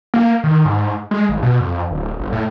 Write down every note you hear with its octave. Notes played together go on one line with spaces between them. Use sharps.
A#3
D#3
G#2
G#3
G#1
B2
F2
D1
G1
A2